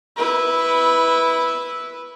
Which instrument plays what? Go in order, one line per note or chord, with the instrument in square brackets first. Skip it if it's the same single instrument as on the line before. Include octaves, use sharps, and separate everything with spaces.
[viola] E4 B4